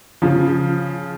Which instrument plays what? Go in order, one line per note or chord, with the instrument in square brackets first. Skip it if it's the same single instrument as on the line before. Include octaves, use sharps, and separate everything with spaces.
[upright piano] C#3 F3